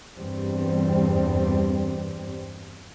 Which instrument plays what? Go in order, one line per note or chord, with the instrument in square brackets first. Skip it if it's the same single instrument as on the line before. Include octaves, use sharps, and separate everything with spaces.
[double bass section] E2 G2 G3 C4